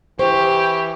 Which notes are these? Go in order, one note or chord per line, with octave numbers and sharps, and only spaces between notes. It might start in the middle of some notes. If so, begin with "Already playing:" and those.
E3 G4 C5 C#6